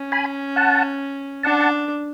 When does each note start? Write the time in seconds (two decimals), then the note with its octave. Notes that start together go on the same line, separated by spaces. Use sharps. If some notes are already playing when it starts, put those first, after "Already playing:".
Already playing: C#4
0.12 G#5 B5
0.56 F#5 A5
1.43 D4 F#5 A5